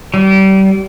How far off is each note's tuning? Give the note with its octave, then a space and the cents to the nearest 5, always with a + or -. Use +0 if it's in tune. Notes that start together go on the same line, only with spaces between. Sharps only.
G3 -30